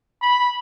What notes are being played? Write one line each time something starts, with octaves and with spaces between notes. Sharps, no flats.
B5